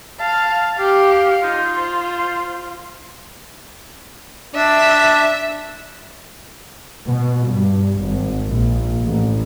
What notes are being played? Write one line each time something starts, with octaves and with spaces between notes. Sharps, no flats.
F5 A5
G4 F5
D#4 F4
C5
D4 E5
B2
G2
G#1
A#1
A1